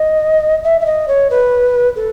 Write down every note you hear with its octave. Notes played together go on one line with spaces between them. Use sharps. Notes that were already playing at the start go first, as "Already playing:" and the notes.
Already playing: D#5
E5
E5
D#5
C#5
B4
A4